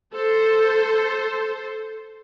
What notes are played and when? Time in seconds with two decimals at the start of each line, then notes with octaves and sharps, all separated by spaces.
0.13 A4 C5